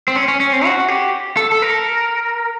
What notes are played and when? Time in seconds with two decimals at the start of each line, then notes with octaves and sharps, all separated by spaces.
0.08 C4
0.16 C#4
0.28 C#4
0.40 C#4
0.53 C4
0.65 F#4
0.88 G4
1.37 A4
1.52 A4
1.62 A#4